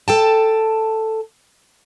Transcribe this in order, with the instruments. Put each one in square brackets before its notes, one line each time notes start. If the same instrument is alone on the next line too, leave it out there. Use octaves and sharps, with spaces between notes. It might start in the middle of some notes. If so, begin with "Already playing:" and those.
[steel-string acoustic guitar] A4 G5 A5